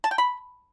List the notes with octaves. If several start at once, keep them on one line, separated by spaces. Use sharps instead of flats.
A5
G5
B5